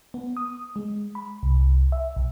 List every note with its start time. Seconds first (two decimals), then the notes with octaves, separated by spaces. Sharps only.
0.14 B3
0.37 D#6
0.76 G#3
1.15 B5
1.43 C2
1.92 E5
2.17 B1